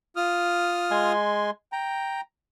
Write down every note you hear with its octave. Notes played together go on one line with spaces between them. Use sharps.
F4 D#6 F6
G#3 G#5 C6
G5 A#5